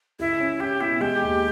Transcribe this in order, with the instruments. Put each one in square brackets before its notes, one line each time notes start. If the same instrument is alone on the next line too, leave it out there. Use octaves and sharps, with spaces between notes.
[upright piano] C#2 [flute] E4
[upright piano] C#4
[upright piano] C#4 [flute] G4
[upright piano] B2 [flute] E4
[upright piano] G#3 [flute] G4
[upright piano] D#2